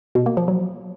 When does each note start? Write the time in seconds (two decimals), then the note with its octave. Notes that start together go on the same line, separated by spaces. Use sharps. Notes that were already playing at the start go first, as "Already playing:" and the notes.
0.15 B2
0.26 A#3
0.37 F3
0.48 F#3